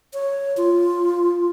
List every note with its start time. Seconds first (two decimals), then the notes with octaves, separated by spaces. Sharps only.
0.14 C#5
0.57 F4